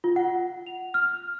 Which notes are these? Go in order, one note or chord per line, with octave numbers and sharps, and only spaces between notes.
F4
F#5
F7
F6